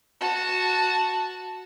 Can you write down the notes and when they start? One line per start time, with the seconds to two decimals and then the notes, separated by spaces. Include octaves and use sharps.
0.20 F#4 A5